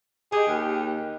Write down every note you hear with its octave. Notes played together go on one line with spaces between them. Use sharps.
D#4 G4 G#4
D#2